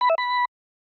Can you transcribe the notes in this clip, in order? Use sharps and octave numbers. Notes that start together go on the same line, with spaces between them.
B5
E5
B5